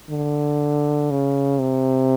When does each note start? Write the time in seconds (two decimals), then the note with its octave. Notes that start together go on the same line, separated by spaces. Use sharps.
0.10 D3
1.11 C#3
1.60 C3